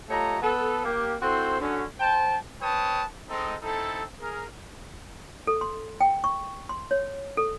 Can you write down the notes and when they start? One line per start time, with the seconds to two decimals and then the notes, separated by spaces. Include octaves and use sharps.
0.10 A3 F4 G4 C#5 D#5 A#5
0.42 B3 A4
0.85 A#3 G4
1.22 C4 E4 F#4 A4 C5
1.60 D3 F#3 C#4
2.00 C5 G5 A5
2.61 C4 B4 C#5 G5 A5 D#6
3.30 G#3 C4 D#4 A4 C5 D#5
3.63 C4 D#4 E4 A4
4.20 G#4 A#4
5.47 A4
5.61 C6
6.01 G5
6.24 C#6
6.69 C6
6.91 C#5
7.37 A4